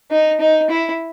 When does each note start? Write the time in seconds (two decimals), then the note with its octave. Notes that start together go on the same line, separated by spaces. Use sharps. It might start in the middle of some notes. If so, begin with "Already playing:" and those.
0.11 D#4
0.40 D#4
0.70 E4